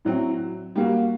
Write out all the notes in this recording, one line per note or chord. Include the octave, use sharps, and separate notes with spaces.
A2 F#3 C4
G3 A#3 F#4